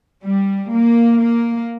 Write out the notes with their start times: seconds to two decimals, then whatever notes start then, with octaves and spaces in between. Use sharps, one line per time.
0.24 G3
0.70 A#3
1.18 A#3